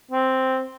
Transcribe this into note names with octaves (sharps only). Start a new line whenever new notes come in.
C4